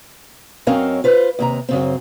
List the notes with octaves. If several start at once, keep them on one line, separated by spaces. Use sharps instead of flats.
F#2 C4 C#4 A#4 D#5 F5
F4 B4 C5
D#2 C3 A#5
F#2 C#3 C4